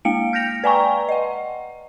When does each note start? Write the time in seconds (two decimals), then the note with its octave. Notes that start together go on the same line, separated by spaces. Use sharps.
0.05 G#3 A#3 C#7 D7
0.33 F6 G6 A#6 F7
0.64 B4 D5 G5 G#5 A#5 C#6
1.09 D#5 F#5